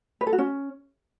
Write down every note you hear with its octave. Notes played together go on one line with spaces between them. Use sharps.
B4
A4
F#4
C#4